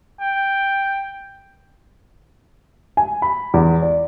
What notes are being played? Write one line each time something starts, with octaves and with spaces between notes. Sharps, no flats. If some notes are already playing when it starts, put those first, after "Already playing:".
G5
G#5
B5
E2
D5